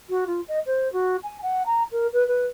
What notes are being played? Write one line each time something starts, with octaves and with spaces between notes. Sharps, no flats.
F#4
F4
D#5
C5
F#4
G#5
F#5
A#5
A#4
B4
B4